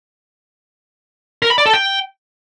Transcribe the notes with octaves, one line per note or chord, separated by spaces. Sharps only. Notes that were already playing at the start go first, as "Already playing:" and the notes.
A#4
B5
D5
A4
G5